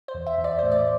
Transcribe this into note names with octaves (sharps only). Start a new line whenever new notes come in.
C5
E2
E5
E2
D5
A2 C5
D5